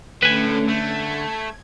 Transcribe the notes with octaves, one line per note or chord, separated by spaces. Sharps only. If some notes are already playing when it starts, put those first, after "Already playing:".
A2 D3 A3 C#4 B4 G#5
A3 G#6